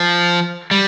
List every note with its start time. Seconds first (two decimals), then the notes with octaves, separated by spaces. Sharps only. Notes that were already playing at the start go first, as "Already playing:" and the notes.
Already playing: F3
0.71 G3